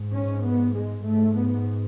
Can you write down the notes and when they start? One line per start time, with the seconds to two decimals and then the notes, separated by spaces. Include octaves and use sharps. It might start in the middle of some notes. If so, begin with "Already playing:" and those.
Already playing: G#2
0.13 C#4
0.44 B3
0.75 G#3
1.05 G#2 A3
1.36 B3